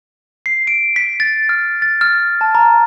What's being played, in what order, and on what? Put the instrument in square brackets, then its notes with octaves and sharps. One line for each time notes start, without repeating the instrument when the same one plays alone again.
[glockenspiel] C7
D7
B6
A6
F6
A6
F6
A5
A#5